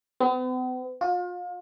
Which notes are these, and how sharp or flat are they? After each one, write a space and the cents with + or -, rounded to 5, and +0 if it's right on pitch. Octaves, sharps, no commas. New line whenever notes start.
B3 +45
F4 +35